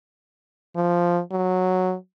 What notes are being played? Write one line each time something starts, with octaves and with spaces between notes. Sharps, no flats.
F3
F#3